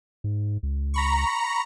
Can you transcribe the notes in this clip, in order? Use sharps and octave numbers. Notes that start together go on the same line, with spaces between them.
G#2
C#2
A#5 B5 C#6